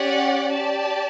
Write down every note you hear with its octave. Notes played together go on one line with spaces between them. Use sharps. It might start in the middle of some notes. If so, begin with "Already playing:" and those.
Already playing: C#4 G4 D5 F#5
G4 D5 A5